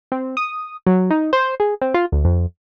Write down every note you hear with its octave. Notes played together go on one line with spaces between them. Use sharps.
C4
D#6
F#3
D#4
C5
G#4
C4
F4
D2
F2